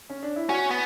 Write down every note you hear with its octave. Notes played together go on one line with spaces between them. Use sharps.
C#4
D4
E4
C#4 F#4
B3